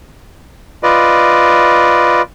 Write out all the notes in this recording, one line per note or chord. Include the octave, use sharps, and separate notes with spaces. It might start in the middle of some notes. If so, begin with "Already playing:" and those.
F4 B4 D5 D#5